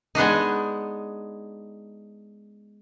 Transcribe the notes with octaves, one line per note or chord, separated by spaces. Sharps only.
G#3 B3 D4 D#4